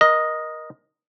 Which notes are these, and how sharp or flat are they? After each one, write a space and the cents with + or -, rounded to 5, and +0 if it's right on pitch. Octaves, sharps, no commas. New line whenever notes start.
A#4 +25 D#5 +0